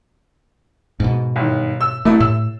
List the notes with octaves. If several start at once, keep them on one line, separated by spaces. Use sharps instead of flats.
G#2 B2
G1 D#3
E6
C2 A3 E4
A2 E6